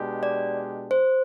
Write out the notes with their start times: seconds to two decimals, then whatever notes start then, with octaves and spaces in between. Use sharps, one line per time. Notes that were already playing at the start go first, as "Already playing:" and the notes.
Already playing: B2 G#3 D4 G4
0.23 D5
0.91 C5